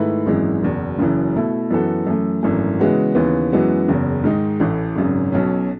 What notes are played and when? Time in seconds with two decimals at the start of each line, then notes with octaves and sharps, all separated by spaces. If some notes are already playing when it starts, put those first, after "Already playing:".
Already playing: G#2 D#3 A3 E4 B4
0.26 G#1 F#2 E3 G#3
0.62 F#1 E2 B2
0.99 F#1 F#2 C#3 E3
1.35 B2 A3 E4
1.71 F#2 E3 B3 F#4 A4
2.07 F#2 E3 A3
2.43 G#1 F#2 E3 A3
2.79 C#3 E3 G#3 B3 F#4
3.15 D#2 C#3 E3 B3
3.52 F#2 E3 G#3 B3 F#4
3.88 F#1 E2 C#3
4.24 G#2 D#3 G#3 D#4
4.60 A1 A2 E3
4.96 G#1 F#2 C#3
5.32 B1 B2 F#3 C#4